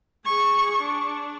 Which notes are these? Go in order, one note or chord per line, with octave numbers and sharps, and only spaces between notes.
G#4 C#6
D4